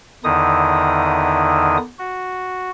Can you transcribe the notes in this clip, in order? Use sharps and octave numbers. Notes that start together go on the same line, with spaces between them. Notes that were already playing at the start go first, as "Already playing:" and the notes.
E2 D3 D#3 D#4 E4 D#6
F#4